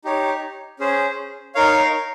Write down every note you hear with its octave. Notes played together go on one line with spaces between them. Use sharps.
D#4 G4 C#5
C#4 G#4 C5
D#4 A#4 C#5 F5